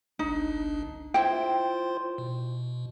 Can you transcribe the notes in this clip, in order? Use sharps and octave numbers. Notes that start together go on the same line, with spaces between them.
G1 C2 D4 D#4
E4 F4 C5 G5 C6
B2